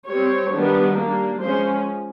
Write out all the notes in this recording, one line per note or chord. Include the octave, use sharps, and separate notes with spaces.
G3 C4 C#5
D#3 G3 B3 D4
G3 A#3 D4
F3 G#3 C#4 C5